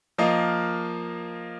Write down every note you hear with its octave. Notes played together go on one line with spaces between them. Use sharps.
F3 A#3 A#4 D#5 F5